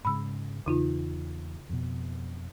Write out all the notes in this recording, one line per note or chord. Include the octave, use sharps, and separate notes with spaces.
G#2 C#3 G#3 B5 E6
E2 C#3 D#4 F4
F2 B2